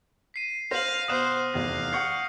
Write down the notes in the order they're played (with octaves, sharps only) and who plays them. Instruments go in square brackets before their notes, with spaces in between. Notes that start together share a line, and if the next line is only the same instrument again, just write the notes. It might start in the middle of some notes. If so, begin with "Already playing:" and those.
[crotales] B6 C7 D#7
[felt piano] C5 [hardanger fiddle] F5 [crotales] A#6 F#7
[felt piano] B2 E7 [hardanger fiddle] F#4 C5 [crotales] D#6 F6 F#6
[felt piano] F1 E2 [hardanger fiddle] F5 [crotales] A#6
[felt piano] F#5 C#6 G6 [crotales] C7 C#7